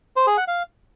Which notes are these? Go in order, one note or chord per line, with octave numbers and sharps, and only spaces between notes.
C5
G#4
F#5
F5